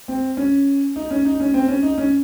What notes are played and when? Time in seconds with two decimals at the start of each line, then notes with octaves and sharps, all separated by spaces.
0.08 C4
0.37 C#4
0.96 D#4
1.10 C#4
1.25 D#4
1.40 C#4
1.54 C4
1.68 C#4
1.83 D#4
1.98 C#4